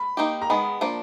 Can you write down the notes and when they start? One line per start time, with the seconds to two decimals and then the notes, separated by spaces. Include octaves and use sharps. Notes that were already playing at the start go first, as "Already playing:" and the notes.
Already playing: B5
0.17 A#3 D#4 G4
0.42 A#5
0.50 D#3 G#3 B3 B5
0.81 F3 A#3 D4